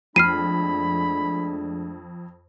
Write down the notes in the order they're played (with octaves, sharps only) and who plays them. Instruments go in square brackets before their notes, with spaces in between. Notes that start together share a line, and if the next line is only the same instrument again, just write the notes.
[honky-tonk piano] F2 [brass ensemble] G#3 A3 D4 [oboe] B5 [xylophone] F6 C7 D#7